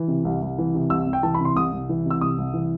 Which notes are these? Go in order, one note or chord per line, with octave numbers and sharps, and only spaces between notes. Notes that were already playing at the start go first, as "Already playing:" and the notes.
Already playing: E3
C3
C2
C2
E3
C3
C2 E6
C2
G5
E3 A5
B5
C3 C6
C2 D#6
C2
E3
C3 E6
C2 D#6
C2
E3